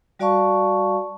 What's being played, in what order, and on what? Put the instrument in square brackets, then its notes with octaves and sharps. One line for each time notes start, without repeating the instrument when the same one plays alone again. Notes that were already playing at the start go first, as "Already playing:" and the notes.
[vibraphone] G3 F#4 D5 F5 A5 C#6